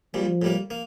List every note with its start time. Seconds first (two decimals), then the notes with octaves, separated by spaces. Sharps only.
0.14 A#1 A#2 F3 G3
0.42 A2 G3 A#3
0.70 A#3